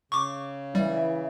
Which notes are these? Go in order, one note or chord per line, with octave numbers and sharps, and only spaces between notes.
C#3 C#6 D6
E3 G3 E5